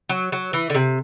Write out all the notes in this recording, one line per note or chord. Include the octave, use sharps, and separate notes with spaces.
F#3
F#3
E3
D3
C3